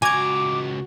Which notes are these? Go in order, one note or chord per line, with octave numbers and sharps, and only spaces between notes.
C#2 F#4 G#5 A#5 D6 G#6